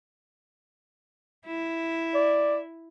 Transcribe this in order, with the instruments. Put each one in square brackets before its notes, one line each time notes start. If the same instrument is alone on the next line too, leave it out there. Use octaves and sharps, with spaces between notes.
[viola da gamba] E4
[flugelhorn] D5